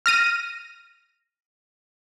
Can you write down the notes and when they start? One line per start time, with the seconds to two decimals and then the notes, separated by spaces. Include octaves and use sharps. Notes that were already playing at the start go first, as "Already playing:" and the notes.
0.06 F6 A#6 D#7